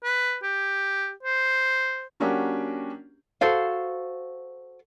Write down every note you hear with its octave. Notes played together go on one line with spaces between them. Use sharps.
B4
G4
C5
F#3 A#3 C#4 D4 F#4 G4
F#4 A4 C5 F5